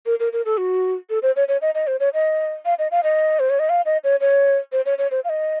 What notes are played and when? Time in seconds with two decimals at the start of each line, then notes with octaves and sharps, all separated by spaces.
0.06 A#4
0.20 A#4
0.33 A#4
0.45 A4
0.58 F#4
1.10 A4
1.23 C5
1.36 C#5
1.48 C#5
1.62 D#5
1.75 D#5
1.87 C5
2.00 C#5
2.14 D#5
2.65 F5
2.79 D#5
2.91 F5
3.04 D#5
3.40 C5
3.50 C#5
3.59 D#5
3.69 F5
3.86 D#5
4.04 C#5
4.21 C#5
4.72 C5
4.86 C#5
4.98 C#5
5.11 C5
5.24 F5
5.29 D#5